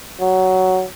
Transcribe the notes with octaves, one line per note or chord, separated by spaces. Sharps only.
F#3